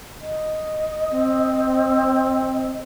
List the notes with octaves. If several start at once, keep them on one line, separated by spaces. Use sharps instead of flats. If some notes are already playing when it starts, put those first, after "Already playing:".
D#5
C4